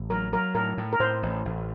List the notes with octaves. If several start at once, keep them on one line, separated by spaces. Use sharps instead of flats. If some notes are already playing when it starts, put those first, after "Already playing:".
Already playing: A1
F#3 A#4
F#3 A#4
A2 A#4
A2
A#4
A2 C5
A1
A1